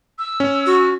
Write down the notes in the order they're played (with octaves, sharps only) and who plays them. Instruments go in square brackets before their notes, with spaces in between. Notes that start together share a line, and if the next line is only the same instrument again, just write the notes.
[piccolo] E6
[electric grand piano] C#4
[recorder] F#4